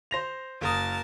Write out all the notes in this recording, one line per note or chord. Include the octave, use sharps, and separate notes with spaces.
C5 A#6 F7
F#1 A#4 A5 D#6